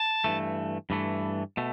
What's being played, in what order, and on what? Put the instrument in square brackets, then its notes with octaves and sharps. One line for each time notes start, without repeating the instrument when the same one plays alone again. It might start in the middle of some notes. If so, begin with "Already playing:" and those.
Already playing: [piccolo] A5
[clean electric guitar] G2 E3 A3
G2 E3 A3
B2 A3